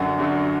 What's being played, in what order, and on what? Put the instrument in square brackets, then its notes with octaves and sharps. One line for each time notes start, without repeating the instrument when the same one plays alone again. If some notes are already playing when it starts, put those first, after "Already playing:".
Already playing: [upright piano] F#2 D3 F#3 F#5
F#2 D3 F#3